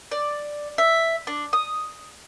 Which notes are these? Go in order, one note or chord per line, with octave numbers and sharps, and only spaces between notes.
D5
E5
D4
D#6